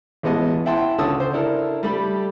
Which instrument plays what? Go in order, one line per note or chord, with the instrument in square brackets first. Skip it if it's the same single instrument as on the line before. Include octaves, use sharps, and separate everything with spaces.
[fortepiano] A1 G#3 B3 D#5 A5
E4 E5 F#5 G5 A5 C6
C#2 D3 C#4 A5 D#6 E6
C5
D4 E4 A4 A#4
G3 A3 G4 B5